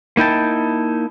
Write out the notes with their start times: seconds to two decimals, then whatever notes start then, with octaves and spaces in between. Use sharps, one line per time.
0.17 A#3 D#4 E4 G5 A5